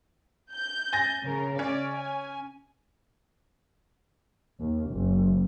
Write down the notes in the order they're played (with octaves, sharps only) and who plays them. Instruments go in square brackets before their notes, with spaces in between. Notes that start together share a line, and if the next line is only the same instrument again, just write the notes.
[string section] G6
[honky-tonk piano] G#5 A6 A#6
[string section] C#3 A#4
[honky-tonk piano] C#4 [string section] D5
[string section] G#5
[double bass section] D#2
F#1